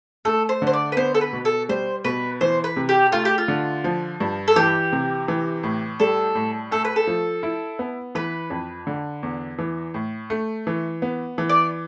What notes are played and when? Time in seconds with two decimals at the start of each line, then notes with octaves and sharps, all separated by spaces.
0.25 A3 A4
0.49 C5
0.62 D3
0.67 C5
0.73 D5
0.92 B4
0.97 B3 C5
1.14 A4
1.21 B4
1.33 B2
1.45 A4
1.69 G3 C5
2.04 B2 B4
2.41 E3 C5
2.64 B4
2.76 C3
2.89 G4
3.12 A3 F4
3.25 G4
3.38 F4
3.48 D3
3.84 F3
4.20 G2
4.48 A4
4.56 E3 G4
4.92 C3
5.28 E3
5.63 A2
6.00 G3 A4
6.35 A2
6.71 A3 A4
6.85 B4
6.96 A4
7.07 F3
7.43 E4
7.79 B3
8.15 E3 B4
8.50 F2
8.87 D3
9.23 E2
9.58 E3
9.94 A2
10.30 A3
10.67 E3
11.02 B3
11.38 E3
11.49 D5